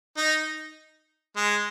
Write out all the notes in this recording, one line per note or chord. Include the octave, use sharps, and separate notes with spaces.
D#4
G#3